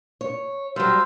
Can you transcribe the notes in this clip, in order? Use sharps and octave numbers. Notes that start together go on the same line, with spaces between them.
C#5
F#3 G3 C5 F5 E6